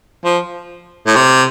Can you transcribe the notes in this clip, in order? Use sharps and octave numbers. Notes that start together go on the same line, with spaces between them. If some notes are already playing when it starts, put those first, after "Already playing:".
F3
A2
C3